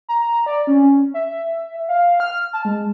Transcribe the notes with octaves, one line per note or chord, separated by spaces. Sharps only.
A#5
D5
C#4
E5
F5
F6
A5
G#3